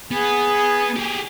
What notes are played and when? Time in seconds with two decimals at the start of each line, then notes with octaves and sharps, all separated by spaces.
0.11 B3 G#4
0.97 G4 G#4